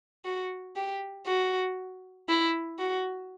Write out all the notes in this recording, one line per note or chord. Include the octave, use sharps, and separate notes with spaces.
F#4
G4
F#4
E4
F#4